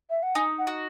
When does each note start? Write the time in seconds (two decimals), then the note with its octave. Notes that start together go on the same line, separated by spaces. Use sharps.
0.10 E5
0.23 F#5
0.35 D#4 G#5
0.59 F#5
0.67 F#4